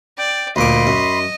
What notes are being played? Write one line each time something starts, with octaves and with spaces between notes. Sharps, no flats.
D5 G5
D2 A#2 D#5 B5 C6 D6
F#2